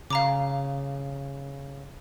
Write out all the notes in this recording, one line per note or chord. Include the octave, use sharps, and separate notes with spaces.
C#3 F5 A#5 D6